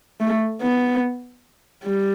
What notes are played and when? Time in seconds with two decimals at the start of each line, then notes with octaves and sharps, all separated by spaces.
0.21 A3
0.62 B3
1.84 G3